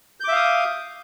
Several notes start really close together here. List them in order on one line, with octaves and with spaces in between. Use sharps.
G6 D6 E5 F5 D#6